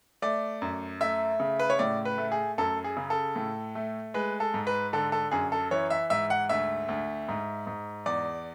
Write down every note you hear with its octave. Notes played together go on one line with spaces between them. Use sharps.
A3 D5
F#2
A3 E5
C#3
B4
C#5
A2 D5
B4
A3
G#4
F#2 A4
G#4
C#3
A4
A2
A3
G#3 B4
A4
G#2
B4
D3 A4
A4
F#2 G#4
A4
E3 C#5
E5
G#2 E5
F#5
D2 E5
D2
G#2
G#2
E2 D5